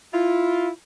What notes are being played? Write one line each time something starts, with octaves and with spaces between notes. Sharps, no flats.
E4 F4